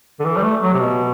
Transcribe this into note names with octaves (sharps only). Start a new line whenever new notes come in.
D3
E3
G3
A3
F#3
C3
B2